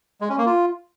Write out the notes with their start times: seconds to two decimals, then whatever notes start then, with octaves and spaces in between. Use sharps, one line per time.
0.21 G#3
0.29 C#4
0.38 A#3
0.46 F4